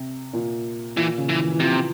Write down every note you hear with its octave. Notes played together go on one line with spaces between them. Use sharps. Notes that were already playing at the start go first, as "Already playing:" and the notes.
Already playing: C3
A#2
A#2 E3
C#3
E3
E3
E3
C3 F3